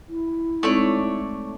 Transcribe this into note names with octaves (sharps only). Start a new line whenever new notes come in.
E4
G#3 A3 C4 D#4 C#5 D5